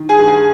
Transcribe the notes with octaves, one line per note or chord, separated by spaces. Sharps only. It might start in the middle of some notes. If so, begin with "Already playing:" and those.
Already playing: D#3
G#4 G#5
G2
G#4 G#5